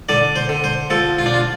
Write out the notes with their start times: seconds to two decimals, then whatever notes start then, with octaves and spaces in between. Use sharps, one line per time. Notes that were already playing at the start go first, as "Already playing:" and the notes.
0.09 D3 D5
0.36 C5
0.49 D3
0.64 C5
0.90 F3 A4
1.19 F4
1.26 D4
1.34 F4